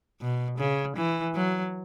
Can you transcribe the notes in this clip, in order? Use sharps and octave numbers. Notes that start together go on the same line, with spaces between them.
B2
C#3
E3
F#3